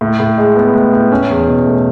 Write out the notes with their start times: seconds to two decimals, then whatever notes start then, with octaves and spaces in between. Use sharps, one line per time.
0.01 A2
0.20 A2
0.38 G#3
0.56 B3
0.74 A2
0.93 A2
1.12 C#4
1.30 E2
1.48 B2
1.66 A3